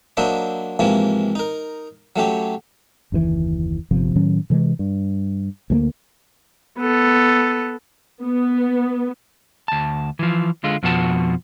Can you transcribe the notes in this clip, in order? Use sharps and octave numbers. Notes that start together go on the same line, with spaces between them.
F#3 A#3 D4 C5 D#5 E5
G#2 C3 E3 F3 A#3
D#4 A#4
F#3 A3 C#4 G4
F#1 D#2 A2 E3
G1 C3 F3
A2 D#3 F#3 C#4
C3 E3 G3 G#3
G2
D2 F3 A#3
B3 A4
B3
D2 A5
E3 F3
D3 G#3 F4
F2 B2 F3 F#4 A5